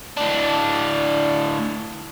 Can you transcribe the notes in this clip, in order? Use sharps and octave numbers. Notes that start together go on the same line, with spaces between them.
A2 D4